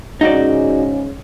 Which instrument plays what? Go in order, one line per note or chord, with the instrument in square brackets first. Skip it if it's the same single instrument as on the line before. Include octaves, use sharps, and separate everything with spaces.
[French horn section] G#2 C#3 C#4 [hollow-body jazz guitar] D#4 F#4 D5